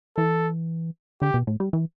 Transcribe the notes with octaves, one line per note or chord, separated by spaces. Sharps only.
E3 A4
D3 G4
B2
A2
G3
E3